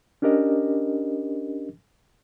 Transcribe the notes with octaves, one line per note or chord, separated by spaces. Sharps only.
C#4 D4 G4 A#4 D#5